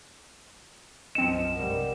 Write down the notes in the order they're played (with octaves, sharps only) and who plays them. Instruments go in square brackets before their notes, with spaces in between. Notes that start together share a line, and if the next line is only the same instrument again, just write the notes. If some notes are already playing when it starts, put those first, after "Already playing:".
[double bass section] B1 F#2 F3 [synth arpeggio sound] C4 C#7 [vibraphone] D#5 C6 [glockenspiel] E7
[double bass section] G2 C3 G3 [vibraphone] A#4 F#5